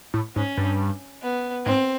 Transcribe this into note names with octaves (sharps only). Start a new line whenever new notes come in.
A2
G#2 C#4
G2
B3
G#2 C4